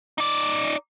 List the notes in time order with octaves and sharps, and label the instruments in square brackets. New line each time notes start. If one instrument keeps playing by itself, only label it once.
[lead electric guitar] D#4 D5